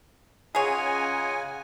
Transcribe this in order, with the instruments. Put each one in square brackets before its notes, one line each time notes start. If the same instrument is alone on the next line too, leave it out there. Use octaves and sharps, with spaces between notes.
[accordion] C#3 G#5 [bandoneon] F4 D#5 F#5 [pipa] G#4 C#5